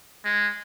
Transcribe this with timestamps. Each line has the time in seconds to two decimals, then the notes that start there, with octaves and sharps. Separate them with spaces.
0.24 G#3